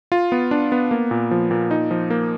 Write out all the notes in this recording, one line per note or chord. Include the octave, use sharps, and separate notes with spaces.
F4
B3
D4
B3
A#3
A#2
F3
A#2
D#4
F3
A#3